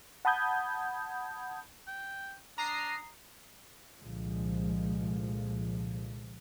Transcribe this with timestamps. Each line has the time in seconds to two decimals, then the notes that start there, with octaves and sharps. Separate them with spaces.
0.25 F#5 A5 B5 D#6 G6 G#6
1.87 G5
2.58 D4 A#5 D#6 C7
4.00 C2 A#2 D3 F3 G#3